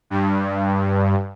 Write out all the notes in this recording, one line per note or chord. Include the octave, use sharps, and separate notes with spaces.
G2